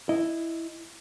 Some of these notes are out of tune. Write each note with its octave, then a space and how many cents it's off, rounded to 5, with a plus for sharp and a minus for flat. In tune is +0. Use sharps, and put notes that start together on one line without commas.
E4 +0 D#5 +0